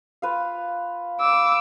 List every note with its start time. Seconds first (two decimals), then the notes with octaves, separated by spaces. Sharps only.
0.22 F4 B4 F5
1.20 D6 E6